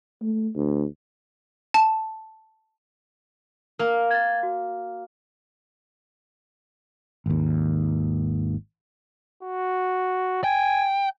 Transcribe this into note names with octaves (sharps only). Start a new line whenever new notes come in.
A3
D2
A5
A#3 A#4
G#6 A6
F#4
G#1 D#2
F#4
G5 G#5